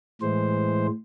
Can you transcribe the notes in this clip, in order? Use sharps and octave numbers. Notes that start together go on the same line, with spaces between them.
A2 E3 G#3 C5